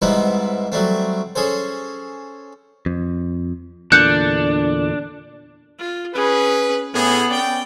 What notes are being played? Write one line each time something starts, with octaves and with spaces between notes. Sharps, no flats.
G#2 G3 B3 C4 D#4 E4
F#3 G3 A3 C4
C#4 G#4 A4 C5
F2
E2 A#2 D3 D4 F#6 G6 C#7
F4
C#4 G#4 B4
A2 B3 G#4
C#4 D5 G5